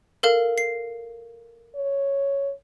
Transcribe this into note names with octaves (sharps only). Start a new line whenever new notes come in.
A4 A#4 F5
C7
C#5